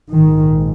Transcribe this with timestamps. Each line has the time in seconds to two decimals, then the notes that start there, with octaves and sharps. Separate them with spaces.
0.12 A#1 G#2 D#3